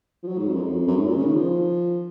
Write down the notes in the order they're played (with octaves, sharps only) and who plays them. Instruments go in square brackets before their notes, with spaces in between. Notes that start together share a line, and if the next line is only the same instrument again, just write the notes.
[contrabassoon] F3
F#3
G#2
F2
F#2
F2
F#2
G#2
A#2
C#3
D#3
F3